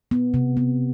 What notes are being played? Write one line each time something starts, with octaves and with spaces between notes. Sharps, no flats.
B3
C3
B3